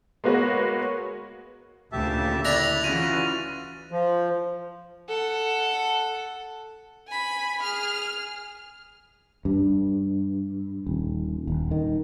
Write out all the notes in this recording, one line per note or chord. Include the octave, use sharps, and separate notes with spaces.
G#3 A#3 B3 F#4 B4 C#5
D2 A#2 C#3 G4 E5 A5
D4 E4 C#5 B5 F#6 A6 A#6 F7
C#3 E3 F4 F#4 D#7
F3
A4 F#5
G#5 B5
G#4 F6
G2
D#1
D#1
D#3